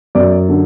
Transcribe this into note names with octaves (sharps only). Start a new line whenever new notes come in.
F#2 D5
D3